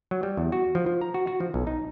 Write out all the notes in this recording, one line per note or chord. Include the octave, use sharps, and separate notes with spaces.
F#3
G3
E2
F#4
F3
F3
A#5
F#4
F#4
F3
B1
D#4